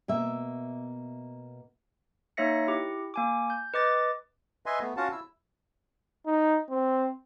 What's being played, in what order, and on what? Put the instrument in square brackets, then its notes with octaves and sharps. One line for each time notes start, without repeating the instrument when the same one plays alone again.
[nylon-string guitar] B2 A#3 E5
[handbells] A#3 D#4 C#5 E5 A#6 C#7
E4 G4
A#3 G#5 D6
G6
B4 D#5 D6 A6
[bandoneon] B4 D#5 E5 G#5 C6
A3 B3
C#4 F4 F#4 F5 F#5 A5
E4 E6
[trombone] D#4
C4